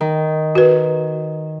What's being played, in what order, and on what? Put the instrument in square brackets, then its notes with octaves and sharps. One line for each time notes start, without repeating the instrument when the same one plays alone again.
[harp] D#3
[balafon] F#4 B4